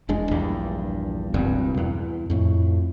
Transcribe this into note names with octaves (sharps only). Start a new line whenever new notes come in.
E1 E2 G#3 D4
A#1 E2 G2
E1 C#2 G2 C4
E2
F2 A2 A3